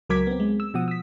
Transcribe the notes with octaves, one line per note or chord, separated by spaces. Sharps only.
C#2 F#3 A#4 D6 G#6 B6
B3 C4
G#3
E6
B2 F3 F#5 D#6
E6 B6